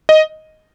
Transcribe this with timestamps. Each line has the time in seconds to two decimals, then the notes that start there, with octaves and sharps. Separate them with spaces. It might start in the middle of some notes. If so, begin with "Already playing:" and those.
0.09 D#5